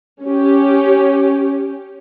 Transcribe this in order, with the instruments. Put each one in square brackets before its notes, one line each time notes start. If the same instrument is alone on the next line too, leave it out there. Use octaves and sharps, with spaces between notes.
[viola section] C#4 G4